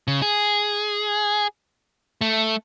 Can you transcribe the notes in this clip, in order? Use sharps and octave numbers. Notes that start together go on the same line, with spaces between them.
C#3
G#4
A3